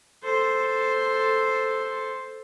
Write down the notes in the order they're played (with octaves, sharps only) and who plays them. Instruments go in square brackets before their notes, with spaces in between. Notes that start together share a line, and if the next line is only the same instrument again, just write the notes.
[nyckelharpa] A4 C5